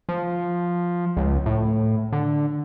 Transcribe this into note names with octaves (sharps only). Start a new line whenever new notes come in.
F3
C#2
A2
D3